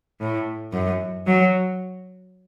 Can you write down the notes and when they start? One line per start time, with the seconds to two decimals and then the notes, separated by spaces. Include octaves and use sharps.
0.21 A2
0.73 F#2
1.27 F#3